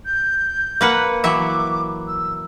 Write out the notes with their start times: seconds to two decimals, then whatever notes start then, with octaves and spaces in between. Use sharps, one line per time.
0.06 G6
0.81 A#3 B4 F#5
1.24 E3 F#3 E5 D6
2.07 E6